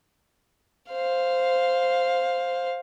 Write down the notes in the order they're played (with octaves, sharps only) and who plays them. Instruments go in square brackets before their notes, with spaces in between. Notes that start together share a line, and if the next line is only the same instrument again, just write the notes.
[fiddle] C5 F5